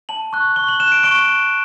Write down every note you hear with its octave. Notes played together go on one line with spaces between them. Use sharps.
A5 F#7
C#6 F#6
C#6 G7
F#7
F#6 E7
D7
C#6 D7